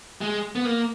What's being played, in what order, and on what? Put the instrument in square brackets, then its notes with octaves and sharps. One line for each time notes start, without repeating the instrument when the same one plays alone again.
[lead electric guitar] G#3
B3
A#3